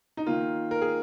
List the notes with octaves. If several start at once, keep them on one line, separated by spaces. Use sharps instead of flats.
D#4
D#3 A#3 F4
A#4
G#4